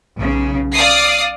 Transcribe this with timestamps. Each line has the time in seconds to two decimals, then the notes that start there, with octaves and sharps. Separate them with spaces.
0.17 B1 C#3
0.74 D5 F5 D#6 C7